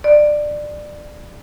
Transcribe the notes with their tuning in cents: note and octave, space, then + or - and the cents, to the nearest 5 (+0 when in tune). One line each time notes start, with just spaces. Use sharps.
D5 +15